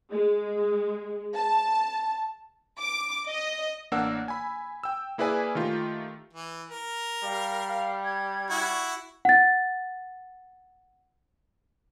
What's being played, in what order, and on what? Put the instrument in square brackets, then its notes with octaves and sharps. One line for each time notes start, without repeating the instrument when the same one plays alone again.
[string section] G#3
A5
[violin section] D6
D#5
[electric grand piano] A1 A#3 D4 A#4 F#5 E6
G#5 B5
G5 E6
A#3 E4 G#4 B4 D5 G#5
D#3 A3 F4 G4
[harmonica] E3
A#4
[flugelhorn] G3 [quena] F5
[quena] F5
G#6
[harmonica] E4 F#4
[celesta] F#5 A6